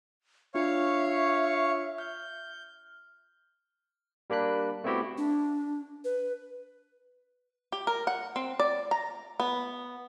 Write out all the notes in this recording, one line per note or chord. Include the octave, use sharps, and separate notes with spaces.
D4 F4 C#5 E5 F5 C#6
F6 G6
G3 A#3 D4 B5 F#6
A3 B3 C4 E4 F#4 G4
D4
B4
G4
A#4
F#5
C4
D5
A#5
B3